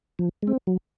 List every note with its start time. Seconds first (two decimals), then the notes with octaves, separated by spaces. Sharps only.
0.19 F3
0.43 G#3 C4
0.67 F#3